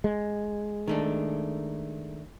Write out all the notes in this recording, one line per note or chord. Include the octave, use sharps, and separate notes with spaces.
G#3
D#3 A3 D4